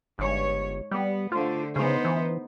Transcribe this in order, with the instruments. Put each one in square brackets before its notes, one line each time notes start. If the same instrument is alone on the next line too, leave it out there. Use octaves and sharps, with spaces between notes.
[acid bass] G1 [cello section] G#2 C#5
[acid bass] G3 [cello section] B3
[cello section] D3 A3 C5 [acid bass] F4
[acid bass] C#3 [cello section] B3 D#4 C5
[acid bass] E3